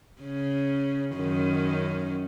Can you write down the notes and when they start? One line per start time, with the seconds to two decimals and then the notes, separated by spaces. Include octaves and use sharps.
0.22 C#3 C#4
1.15 F#2 D#3 C#4